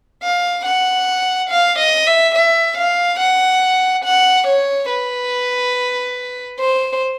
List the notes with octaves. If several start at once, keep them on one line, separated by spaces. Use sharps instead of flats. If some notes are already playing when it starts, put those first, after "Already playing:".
F5
F#5
F5
D#5
E5
E5
F5
F#5
F#5
C#5
B4
C5